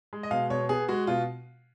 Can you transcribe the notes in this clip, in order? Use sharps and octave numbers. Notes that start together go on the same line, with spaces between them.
G#3
D#5
B2 F5
B2 C#5
B3 G#4
G#3 F#4
B2 F4